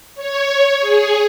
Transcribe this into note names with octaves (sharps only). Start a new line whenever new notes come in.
C#5
G#4